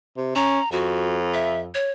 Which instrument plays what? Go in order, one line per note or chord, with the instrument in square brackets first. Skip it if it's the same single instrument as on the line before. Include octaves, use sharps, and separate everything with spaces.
[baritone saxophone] C3
[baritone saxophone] C#4 [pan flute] A#5
[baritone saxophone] F2 [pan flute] F#4
[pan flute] E5
C#5